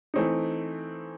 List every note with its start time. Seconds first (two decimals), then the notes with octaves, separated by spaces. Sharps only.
0.14 E3 A3 C4 D#4